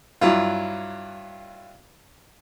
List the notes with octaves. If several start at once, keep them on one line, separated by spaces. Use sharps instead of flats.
G2 F#3 E4 F4